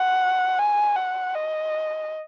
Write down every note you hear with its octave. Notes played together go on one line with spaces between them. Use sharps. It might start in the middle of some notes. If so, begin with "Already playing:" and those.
Already playing: F#5
G#5
F#5
D#5